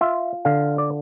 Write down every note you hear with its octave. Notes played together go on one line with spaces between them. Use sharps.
F4 E5
D3 F5
D5